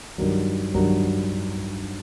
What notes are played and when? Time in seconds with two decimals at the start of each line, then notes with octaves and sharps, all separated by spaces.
0.18 G2 D#3 F#3
0.74 G2 D#3 F#3